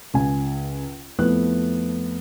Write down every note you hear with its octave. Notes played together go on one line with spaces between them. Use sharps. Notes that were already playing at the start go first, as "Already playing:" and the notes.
C#2 G#5
F2 F3 A3 B3 E4 F#6